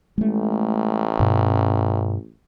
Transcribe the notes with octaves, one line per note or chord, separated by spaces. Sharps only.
A1 G#3 A3
G2 B2 C#4